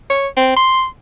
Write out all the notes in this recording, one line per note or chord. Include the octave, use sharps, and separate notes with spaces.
C#5
C4
C6